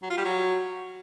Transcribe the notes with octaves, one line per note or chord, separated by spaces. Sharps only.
F#3
F4
G3
F#3